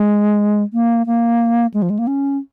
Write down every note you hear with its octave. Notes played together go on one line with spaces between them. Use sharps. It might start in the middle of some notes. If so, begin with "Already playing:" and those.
Already playing: G#3
A#3
A#3
G#3
F3
G#3
A#3
C#4